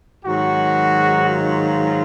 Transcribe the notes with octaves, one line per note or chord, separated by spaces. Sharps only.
G#2 D#3 F#3 F#4
F4